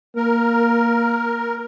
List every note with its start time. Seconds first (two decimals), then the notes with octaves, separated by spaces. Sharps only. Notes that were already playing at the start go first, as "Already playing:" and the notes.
0.16 A#3 A#4